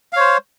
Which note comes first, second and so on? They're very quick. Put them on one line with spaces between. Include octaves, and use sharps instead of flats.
F5 C#5 C5